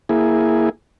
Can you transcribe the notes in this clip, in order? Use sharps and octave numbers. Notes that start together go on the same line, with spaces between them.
A#3 E4 G#4